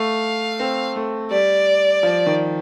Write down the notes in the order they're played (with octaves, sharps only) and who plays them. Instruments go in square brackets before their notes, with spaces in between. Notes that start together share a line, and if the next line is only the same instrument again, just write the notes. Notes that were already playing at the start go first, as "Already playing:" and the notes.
Already playing: [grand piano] A3 [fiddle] F5
[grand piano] C4
A3
[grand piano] G3 [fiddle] D5
[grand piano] F3
D#3